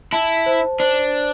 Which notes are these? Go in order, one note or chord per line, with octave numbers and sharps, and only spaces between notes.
E4 A5
C5
D4 C5